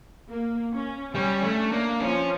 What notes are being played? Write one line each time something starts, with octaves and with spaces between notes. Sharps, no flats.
A#3
C#4
G3 C#4
A3
D4
A#3
F3 C#4